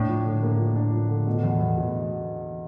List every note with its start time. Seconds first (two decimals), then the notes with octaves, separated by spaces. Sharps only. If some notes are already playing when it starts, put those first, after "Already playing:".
Already playing: A2 D4
0.09 F3
0.25 D3
0.43 A#3
0.59 F3
0.76 D4
0.93 F3
1.09 D3
1.27 B2
1.43 E2
1.61 E2
1.77 B2